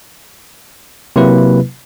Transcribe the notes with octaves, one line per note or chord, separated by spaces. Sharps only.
C3 F#3 A#3 E4 B4